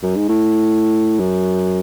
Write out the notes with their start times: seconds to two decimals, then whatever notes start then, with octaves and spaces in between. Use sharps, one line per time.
0.03 F#2
0.17 G#2
0.29 A2
1.20 F#2